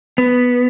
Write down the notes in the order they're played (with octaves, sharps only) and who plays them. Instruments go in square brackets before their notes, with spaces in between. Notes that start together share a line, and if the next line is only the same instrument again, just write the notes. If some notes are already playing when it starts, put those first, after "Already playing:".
[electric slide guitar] B3